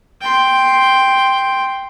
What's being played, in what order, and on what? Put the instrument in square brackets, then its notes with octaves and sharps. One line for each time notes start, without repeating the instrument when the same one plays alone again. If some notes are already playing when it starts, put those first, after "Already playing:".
[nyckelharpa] G5 C6